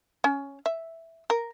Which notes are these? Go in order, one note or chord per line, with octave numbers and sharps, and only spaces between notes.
C#4
E5
A#4